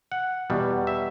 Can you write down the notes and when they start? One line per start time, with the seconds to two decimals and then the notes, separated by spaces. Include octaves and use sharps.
0.12 F#5
0.50 E2 B2 G3
0.87 E5